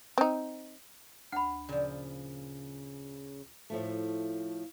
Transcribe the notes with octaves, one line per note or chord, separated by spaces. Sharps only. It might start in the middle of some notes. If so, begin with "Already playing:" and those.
C4 D#4
D2 F#5 B5
A#2 C#3 F3
A2 F3 A3